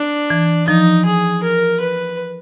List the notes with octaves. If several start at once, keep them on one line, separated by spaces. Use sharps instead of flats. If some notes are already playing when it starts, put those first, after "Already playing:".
Already playing: D4
E3
F3 D#4
G#4
A#4
B4